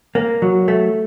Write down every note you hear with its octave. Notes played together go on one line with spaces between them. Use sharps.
A#3
F#3
A3